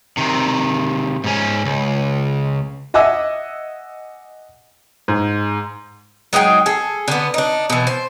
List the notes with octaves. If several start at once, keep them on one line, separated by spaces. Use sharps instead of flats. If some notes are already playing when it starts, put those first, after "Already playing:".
C3 D#3
G#2 C#4
C#2
D#5 E5 F#5 G#5 D6 E6
G#2
F#3 G#3 D#4 G5
G#4 A4
D3 B3
D4 D#4
B2 E3
C5